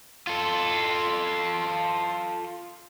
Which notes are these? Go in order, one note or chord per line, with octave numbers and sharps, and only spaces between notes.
F4 A4